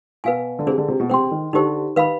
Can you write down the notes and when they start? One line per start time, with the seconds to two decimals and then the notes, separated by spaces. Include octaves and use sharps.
0.24 B2 B4 F5 G#5
0.59 D3
0.67 C3 D4 G#4 C5
0.78 D3
0.88 C3
1.00 B2
1.10 C3 C5 G5 C6
1.31 D#3
1.53 D3 D#4 G4 C5
1.96 D#3 B4 F5 B5